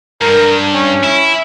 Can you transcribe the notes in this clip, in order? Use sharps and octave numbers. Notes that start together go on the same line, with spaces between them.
G2 A#4
C#4
E4